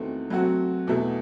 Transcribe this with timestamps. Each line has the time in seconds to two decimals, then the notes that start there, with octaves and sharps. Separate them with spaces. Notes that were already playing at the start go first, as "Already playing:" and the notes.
Already playing: E2 D#3 A3 C4 F#4
0.30 F#3 A3 C4 F#4
0.87 E2 B2 A3